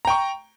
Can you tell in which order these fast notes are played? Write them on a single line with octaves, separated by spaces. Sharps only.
A#5 G5 C#6